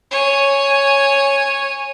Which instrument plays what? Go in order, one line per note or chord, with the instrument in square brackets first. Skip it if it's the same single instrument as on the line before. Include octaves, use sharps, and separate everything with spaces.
[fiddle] C#5 G#5